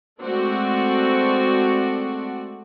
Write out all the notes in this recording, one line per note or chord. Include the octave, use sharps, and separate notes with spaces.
G#3 A3 C4 F#4 D5